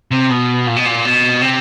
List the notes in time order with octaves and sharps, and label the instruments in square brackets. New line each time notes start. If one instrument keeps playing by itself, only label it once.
[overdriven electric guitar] C3
B2
A#2
B2
A#2
B2
C3